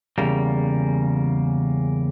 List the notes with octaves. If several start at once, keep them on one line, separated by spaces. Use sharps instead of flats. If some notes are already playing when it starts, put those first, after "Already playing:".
E2 C#3 G3 A#3